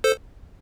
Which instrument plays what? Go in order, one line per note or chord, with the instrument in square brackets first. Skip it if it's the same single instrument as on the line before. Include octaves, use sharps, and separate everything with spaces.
[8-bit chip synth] A4 C5